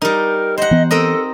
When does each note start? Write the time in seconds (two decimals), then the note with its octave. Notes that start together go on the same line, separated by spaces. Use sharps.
0.02 G3 D#4 A#4
0.58 C5 D#5 F#5
0.71 E3 B3
0.91 C4 A4 A#4 D#5